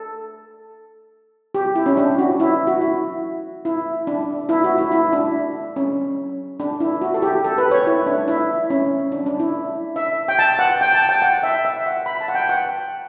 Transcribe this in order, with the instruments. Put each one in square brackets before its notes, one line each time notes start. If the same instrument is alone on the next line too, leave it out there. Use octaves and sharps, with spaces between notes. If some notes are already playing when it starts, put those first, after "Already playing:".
Already playing: [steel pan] A4
G4
E4
C#4
D4
F#4
E4
F#4
E4
E4
D4
E4
F#4
E4
E4
D4
C#4
D4
E4
F#4
A4
G4
A4
B4
C#5
E4
D4
E4
C#4
D4
D4
E4
E5
G5
A5
F#5
G5
A5
G5
F#5
E5
E5
F#5
B5
A5
F#5
G5
F#5